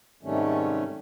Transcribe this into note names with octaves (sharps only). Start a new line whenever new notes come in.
G#2 C3 D#3 G3 A3 C#4